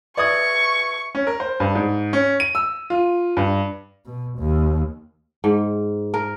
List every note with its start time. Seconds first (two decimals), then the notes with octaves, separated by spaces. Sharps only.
0.17 B4 D5 E5 C#6 D#6 G#6
1.15 C#4
1.27 A#4
1.40 C5
1.60 G2
1.75 G#2
2.13 C#4
2.40 D#7
2.55 E6
2.90 F4
3.37 G2
4.06 B2
4.38 D#2
5.44 G#2
6.14 A#4